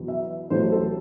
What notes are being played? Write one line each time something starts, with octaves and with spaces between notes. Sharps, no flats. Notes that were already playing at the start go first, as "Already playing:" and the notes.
Already playing: E2 B2 F#3 B3
E5
A1 A2 F#3 A3 C5
A4